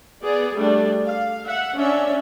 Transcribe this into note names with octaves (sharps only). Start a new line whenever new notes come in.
B3 G#4 D5
G3 A3 D4
F5
E5 F#5
C#4 D4 E5